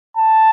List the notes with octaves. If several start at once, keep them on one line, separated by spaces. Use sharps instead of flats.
A5